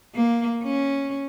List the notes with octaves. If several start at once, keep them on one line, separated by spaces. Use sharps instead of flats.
A#3
C#4